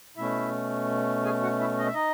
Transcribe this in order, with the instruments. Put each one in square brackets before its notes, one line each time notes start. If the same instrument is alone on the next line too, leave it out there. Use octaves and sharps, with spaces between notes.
[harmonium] B2 A3 C#4 E4 E5
G#4 G#5
F#4 F#5
E4 E5
D#5
E5
D#4 D#5